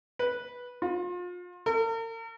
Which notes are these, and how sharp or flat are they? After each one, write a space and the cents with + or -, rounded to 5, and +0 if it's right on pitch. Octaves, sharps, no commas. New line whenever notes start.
B4 -10
F4 +35
A#4 -45